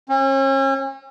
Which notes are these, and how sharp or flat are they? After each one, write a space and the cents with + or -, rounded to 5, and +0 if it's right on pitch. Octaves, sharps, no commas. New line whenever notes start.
C#4 -40